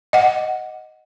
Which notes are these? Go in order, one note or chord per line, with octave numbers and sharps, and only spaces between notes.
D#5 F#5